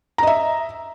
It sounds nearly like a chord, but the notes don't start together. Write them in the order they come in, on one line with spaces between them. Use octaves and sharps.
A#5 D#5 E5